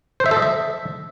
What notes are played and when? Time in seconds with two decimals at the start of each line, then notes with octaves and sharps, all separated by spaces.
0.20 C5
0.26 E5
0.31 A4
0.37 D#5
0.42 E5